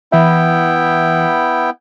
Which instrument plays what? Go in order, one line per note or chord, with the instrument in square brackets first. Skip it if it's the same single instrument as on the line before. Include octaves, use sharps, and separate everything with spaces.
[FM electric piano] E3 E5 [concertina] B3 E4 G5